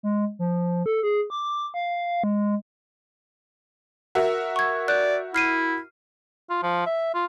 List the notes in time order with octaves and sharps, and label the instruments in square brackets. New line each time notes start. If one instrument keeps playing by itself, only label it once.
[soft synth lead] G#3
F3
A4
G#4
D6
F5
G#3
[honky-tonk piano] F#4 A#4 E5
[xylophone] C#6 G#6
[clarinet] D5 [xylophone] F#6 G6
[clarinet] E4 [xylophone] F6 C7 D#7
[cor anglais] F4
F3
E5
F4